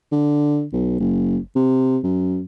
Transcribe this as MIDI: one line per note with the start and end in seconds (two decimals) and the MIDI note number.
0.12 0.64 50
0.73 0.97 35
1.00 1.37 30
1.56 1.98 48
2.03 2.42 42